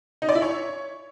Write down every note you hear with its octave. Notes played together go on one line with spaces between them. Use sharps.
D#4
D5
E4
C#5